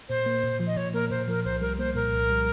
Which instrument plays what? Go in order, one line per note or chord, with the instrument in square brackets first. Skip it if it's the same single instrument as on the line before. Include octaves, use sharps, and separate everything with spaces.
[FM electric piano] A#2 [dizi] C5
[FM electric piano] A#3
A#2
F3
[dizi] D#5
[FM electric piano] A#2 [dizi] C#5
[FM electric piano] A#3 [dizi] A#4
[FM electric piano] A#2 [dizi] C5
[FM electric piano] F3 [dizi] A#4
[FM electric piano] C2 [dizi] C5
[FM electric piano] G3 [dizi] A#4
[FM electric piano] A#3 [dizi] C5
[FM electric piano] A#2 [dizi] A#4
[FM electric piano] C2
G3